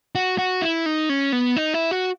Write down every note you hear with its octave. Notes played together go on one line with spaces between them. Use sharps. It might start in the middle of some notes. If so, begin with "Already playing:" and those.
F#4
F#4
E4
D#4
C#4
B3
D#4
E4
F#4